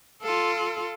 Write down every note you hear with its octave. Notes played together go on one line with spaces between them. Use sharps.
F4 A4